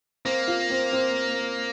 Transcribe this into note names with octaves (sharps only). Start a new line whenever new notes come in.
A#3 C4
F4
C4
C4